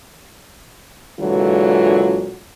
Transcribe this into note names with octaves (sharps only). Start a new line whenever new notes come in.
A#2 D3 E3 F#3 G#3 F4